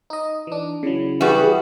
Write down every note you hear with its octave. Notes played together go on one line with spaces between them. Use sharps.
D#4 D#5
E3 D4
C#3 F#3 E4
E3 G3 F#4 G#4